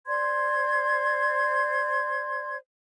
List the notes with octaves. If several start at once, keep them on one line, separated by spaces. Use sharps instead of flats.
C5 D5 C6 G#6